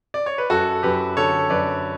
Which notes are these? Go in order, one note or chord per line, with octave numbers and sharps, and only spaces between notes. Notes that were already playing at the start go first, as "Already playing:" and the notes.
D5
C#5
B4
F#2 F#4 A4
F#2 G4 B4
D3 A4 C#5
F#2 B4 D5